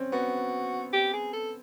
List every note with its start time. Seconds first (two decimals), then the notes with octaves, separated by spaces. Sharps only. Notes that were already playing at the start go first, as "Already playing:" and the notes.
Already playing: C4 C#4
0.12 B3 F#4
0.93 G4
1.13 G#4
1.33 A4